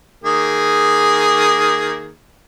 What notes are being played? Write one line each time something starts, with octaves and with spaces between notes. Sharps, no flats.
D#3 A#3 G#4